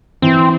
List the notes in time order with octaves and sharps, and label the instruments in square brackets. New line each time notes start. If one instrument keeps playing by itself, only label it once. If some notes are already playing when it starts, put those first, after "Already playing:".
[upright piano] E3 [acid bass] C4